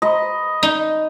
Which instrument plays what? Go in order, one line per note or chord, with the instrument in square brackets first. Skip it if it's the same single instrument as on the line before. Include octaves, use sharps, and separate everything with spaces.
[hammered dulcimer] D#5 B5
[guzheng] D#4